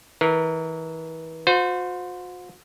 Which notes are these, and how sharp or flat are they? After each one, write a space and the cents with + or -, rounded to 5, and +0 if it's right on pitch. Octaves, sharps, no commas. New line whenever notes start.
E3 -35 A#4 -20
F#4 -45 C5 -20